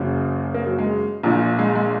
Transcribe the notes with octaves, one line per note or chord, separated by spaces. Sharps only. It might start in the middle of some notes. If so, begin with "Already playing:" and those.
Already playing: F#1 F#2 C#3
A#3
F#3
G#3
A#1 A#2
G#3
G#3